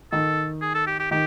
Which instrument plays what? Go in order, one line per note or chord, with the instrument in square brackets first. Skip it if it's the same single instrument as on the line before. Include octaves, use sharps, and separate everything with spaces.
[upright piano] D#3 [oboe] A4
[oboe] G#4
A4
G4
G4
[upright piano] D#3 [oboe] G4